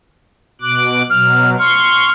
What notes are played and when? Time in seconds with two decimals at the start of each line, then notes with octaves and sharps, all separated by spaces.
0.62 B2 D6 F#6
1.10 B2 F#3 F6
1.59 C6 C#6 F6